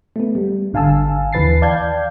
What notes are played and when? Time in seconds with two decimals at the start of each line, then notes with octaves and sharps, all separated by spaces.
0.16 A3 B3
0.35 G3
0.73 G#1 D3 F5 G#5 A5 E6
1.33 D#2 E3 B4 A6 C7
1.62 D5 F5 G5 A5 G6 G#6